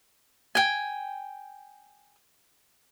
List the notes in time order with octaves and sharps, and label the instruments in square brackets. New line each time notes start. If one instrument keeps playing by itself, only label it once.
[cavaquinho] G5 G#5